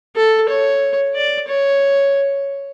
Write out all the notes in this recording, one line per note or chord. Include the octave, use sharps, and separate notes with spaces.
A4
C#5
D5
C#5